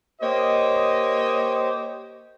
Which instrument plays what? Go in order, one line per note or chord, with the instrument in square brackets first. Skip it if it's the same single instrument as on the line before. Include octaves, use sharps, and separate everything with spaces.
[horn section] A#3 C#5 D#5 [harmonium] G4 C5